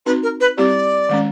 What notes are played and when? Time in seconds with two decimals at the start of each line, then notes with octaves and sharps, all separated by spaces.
0.06 C4 D#4 F#4 B4
0.23 A#4
0.40 B4
0.57 G3 C4 E4 G4 D5
1.09 D#3 G#3 C#4